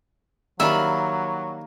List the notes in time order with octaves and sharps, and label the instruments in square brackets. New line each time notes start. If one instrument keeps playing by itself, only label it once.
[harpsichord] D#3 G3 E4 [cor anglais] F#3 [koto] A#3 F4 [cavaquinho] E5 B5